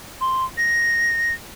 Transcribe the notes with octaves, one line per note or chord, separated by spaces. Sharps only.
C6
A#6